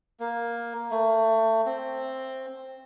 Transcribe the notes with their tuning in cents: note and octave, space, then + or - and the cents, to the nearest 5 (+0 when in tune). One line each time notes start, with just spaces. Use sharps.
A#3 +10
A3 +25
C4 +10